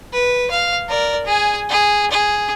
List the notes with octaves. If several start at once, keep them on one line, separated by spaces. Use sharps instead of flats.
B4
F5
A#4 D5
G#4 G#5
G#4
G#4